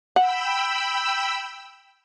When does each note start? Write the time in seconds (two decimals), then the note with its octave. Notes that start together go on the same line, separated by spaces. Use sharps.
0.16 F#5 G5 B5 E6